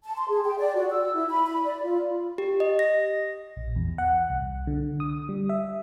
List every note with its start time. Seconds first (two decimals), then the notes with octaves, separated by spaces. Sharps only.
0.04 A5
0.17 C6
0.29 G#4
0.45 G5
0.58 D5
0.74 F#4
0.90 E6
1.15 E4
1.29 B5
1.46 B5
1.64 D5
1.84 F4
2.38 G4
2.60 D#5
2.79 A#6
3.56 A#1
3.76 E2
3.98 F#5
4.30 C2
4.67 D3
5.00 D#6
5.29 G3
5.49 E5